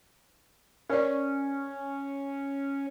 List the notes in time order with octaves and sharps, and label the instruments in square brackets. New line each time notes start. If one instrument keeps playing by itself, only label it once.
[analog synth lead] C#4 [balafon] A#4 C#5 D5